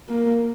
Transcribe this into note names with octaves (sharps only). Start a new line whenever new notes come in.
A#3